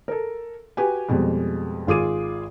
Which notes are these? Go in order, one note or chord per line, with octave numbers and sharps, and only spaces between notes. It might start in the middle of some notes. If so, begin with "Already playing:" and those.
A4 A#4
F#4 G4 B4 G#5
F2 B2 G3 G#3
G#1 F4 G#4 D6 D#7